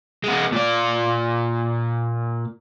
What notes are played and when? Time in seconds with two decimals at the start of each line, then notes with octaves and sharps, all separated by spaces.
0.24 G#3 B3
0.52 A#2 D5